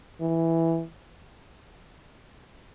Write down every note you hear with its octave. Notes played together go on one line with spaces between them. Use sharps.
E3